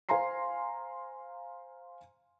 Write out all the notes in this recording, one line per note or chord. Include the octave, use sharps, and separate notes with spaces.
C5 F5 G#5 A#5 C6 C7